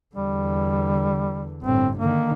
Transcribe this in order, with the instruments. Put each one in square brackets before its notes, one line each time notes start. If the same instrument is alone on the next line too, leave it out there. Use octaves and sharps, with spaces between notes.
[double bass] E2 D3 [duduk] G3
[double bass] G1 A2 [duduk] C4
[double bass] D3 D#3 [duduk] A#3